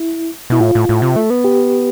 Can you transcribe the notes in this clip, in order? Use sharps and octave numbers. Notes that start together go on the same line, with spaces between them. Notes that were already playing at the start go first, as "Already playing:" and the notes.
Already playing: E4
B2 E4
A2 F4
A2
A2
C3
A3
B3
G4